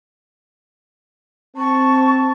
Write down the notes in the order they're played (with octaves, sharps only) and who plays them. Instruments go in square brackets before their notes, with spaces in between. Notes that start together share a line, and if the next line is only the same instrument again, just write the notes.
[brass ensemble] C4 A5 [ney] C#6